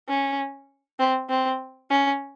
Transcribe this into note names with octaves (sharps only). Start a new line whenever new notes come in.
C#4
C4
C4
C#4